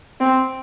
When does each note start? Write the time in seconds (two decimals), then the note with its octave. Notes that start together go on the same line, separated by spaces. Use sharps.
0.20 C4